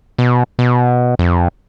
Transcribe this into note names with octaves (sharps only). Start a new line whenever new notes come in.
B2
B2
F2